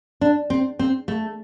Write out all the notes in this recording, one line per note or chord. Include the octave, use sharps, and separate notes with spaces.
D4
C4
C4
A3